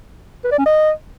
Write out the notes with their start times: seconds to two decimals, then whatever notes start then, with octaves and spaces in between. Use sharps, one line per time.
0.44 B4
0.51 D5
0.59 C#4
0.66 D#5